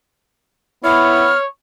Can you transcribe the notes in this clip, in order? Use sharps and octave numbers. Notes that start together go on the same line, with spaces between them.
B3 E4 C#5 F6